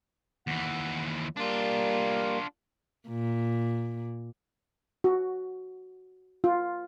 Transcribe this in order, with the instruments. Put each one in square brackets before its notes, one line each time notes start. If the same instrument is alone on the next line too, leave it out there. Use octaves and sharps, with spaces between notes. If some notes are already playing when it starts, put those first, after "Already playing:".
[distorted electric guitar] D#2 E3 [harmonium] F#5
[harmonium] G3 A#3 [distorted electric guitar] D4 F4
[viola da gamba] A#2
[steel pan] F#4
F4